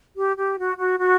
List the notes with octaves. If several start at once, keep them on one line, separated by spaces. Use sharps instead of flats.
G4
G4
F#4
F#4
F#4